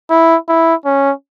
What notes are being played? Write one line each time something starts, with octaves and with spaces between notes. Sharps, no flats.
E4
E4
C#4